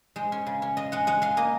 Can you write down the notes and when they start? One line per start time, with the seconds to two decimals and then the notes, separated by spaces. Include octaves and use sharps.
0.16 G#3 C5
0.32 C#4
0.46 C#3
0.62 C#4
0.77 G#3 D#5
0.92 G#3 F#5
1.07 G#3 F#5
1.22 G#3 F5
1.37 A#3 D#5